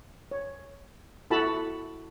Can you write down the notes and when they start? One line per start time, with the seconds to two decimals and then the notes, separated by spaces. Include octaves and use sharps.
0.31 C#5
1.30 E4 F#4 A4 A5 B5